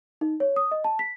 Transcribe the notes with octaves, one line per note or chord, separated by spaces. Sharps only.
D#4
C#5
D#6
D#5
A5
B6